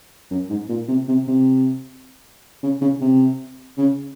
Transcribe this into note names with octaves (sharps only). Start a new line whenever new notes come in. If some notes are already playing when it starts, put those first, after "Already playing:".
F#2
G#2
A#2
C3
C3
C3
C#3
C#3
C3
C#3